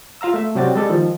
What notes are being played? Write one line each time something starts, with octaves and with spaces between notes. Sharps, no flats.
F4 F5 A#5 E6
A3 E5
C3 F#3 G3 C4 F#4 A6
G3 G#3 A4 A6
D#3 F3